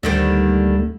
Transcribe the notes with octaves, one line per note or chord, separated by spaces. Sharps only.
D2 D3 D#3 G3 A3